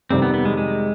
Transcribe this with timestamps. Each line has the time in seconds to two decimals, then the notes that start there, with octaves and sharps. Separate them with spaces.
0.10 F2 C3 D#3 G3 C4
0.22 B3
0.34 B3
0.45 G#3
0.57 G#3